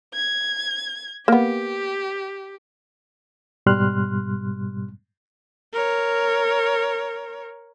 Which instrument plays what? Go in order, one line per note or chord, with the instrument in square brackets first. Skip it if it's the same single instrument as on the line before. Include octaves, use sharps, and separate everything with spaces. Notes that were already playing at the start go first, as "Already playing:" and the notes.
[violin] G#6
[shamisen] A#3 B3 [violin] G4
[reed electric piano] G#2 B2 G3 C6 F6 F#6
[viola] A#4 C#5